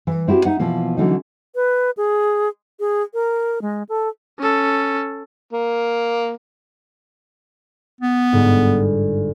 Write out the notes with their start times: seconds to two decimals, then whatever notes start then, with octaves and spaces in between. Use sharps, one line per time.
0.07 E3
0.27 C4 E4 F#4 G4
0.45 D#4 E5 F#5
0.59 B2 E3 F3 A#3
0.97 D3 E3 F#3 A#3 C#4 D#4
1.55 B4
1.97 G#4
2.80 G#4
3.14 A#4
3.62 G#3
3.89 A4
4.39 C#4 A4
5.53 A#3
8.01 B3
8.33 G1 G#2